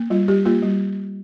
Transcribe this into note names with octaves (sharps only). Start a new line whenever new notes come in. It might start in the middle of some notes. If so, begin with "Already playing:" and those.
Already playing: A#3
G3 F4
G3 G4
A#3 F4
G3